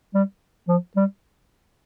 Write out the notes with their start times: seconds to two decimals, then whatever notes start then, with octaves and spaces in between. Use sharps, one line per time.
0.14 G3
0.68 F3
0.96 G3